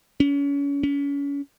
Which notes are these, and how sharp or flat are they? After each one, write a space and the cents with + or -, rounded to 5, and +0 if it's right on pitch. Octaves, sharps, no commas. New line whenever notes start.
C#4 +30
C#4 +35